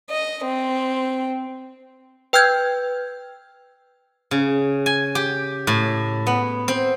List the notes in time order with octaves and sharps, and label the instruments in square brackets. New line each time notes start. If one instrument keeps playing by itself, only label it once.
[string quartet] D#5
C4
[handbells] B4 G5 E6 F6 G6 G#6
[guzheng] C#3
G#5
G4
A2
B3
C4